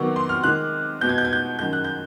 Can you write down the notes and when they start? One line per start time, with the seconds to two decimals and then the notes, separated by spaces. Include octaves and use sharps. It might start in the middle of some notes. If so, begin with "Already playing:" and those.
Already playing: C3 D#3 F#3 B3 C#6
0.16 C6
0.29 F6
0.44 C3 D#3 G#3 F#6
1.01 B2 G#3 B3 G6
1.09 G#6
1.18 G6
1.25 G#6
1.33 G6
1.59 F#2 D#3 G#3 G6
1.73 F#6
1.84 G6